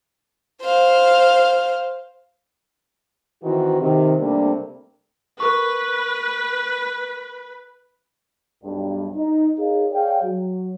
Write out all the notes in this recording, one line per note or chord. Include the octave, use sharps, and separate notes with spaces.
C5 F5
D#3 E3 C4 F#4
C3 D#3
C3 G3 A3 A#3 D4
A#4 B4 C#6
B1 G2
D#4
D#4 G#4 A#4 C#5 D#5 F5
G#4 C#5 D5 F5 G5
F#3